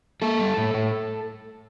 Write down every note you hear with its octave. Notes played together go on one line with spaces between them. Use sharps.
A#3 A4
G3
A2
A2